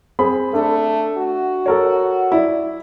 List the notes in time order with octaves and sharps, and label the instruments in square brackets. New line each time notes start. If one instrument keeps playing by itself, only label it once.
[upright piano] C4 G#4 B5
[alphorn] A3 [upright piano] D4
[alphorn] F#4
[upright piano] A4 A#4 C#5
E4 D5